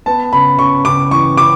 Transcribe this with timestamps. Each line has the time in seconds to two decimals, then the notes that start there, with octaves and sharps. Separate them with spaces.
0.06 B3 A5
0.33 C#3 B5
0.58 C#3 C#6
0.85 C#3 D6
1.11 E3 C#6
1.37 C#3 D6